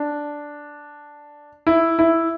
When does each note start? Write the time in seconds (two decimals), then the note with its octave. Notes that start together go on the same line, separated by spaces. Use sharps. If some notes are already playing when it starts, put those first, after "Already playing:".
Already playing: D4
1.67 E4
1.99 E4